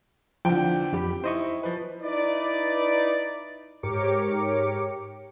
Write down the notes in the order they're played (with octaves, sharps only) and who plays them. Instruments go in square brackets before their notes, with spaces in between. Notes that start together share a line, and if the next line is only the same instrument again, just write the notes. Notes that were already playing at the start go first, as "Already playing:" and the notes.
[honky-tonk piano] E2 D3 [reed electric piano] F3 [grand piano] G5
[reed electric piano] F2 G4 B5
[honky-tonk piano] D#4 E4 [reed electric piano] C5 D#5 C#6
[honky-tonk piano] F3 B4
[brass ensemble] D#4 E4 B4 D5
[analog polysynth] G#2 G4 A#4 C#5 D6 C#7